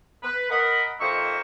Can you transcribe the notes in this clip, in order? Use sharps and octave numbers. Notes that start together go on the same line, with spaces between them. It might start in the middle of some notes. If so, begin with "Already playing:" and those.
B4
A#4 D#5 F#5 B5
F2 A#3 D#4 C5 E5 C#6